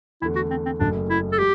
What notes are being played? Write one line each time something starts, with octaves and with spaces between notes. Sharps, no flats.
E2 D3 A3 E4
F#4
C4
C4
F#1 F#2 F#3 A3 D4
E4
A4
F#3 G4